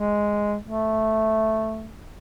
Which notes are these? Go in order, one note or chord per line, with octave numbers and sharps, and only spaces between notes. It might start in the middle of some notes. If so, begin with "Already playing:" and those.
Already playing: G#3
A3